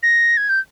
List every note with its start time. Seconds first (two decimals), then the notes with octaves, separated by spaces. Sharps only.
0.03 A#6
0.37 G#6
0.49 G6